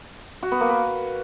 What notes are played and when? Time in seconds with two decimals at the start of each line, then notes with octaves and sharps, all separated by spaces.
0.43 F#4
0.52 B3
0.61 A#3
0.70 B4